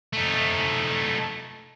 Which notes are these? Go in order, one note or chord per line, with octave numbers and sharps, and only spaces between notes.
A3 D#4